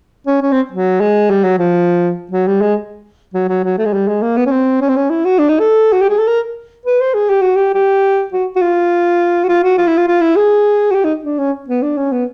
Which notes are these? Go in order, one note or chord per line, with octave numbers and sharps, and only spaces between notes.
C#4
C#4
C4
F#3
G#3
G3
F#3
F3
F#3
G3
G#3
F#3
F#3
F#3
A3
G#3
G3
G#3
A#3
B3
C#4
C4
C#4
C4
C#4
E4
F#4
D4
D#4
A4
F#4
G4
G#4
A4
A#4
B4
C5
G#4
G4
F#4
G4
G4
F#4
F#4
F4
F#4
F4
F#4
F4
E4
F4
F4
E4
G#4
F#4
G4
D#4
D4
C#4
B3
D4
C#4
B3